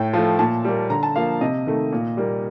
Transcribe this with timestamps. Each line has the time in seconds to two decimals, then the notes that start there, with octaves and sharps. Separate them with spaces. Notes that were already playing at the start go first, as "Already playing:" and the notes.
Already playing: A2 G5
0.13 F3 A3
0.39 A#2 A5
0.65 G3 A#3
0.90 D3 A#5
1.03 A5
1.16 F3 A#3 F5
1.41 C3 D#5
1.67 D#3 A3
1.92 A#2
2.17 G3 A#3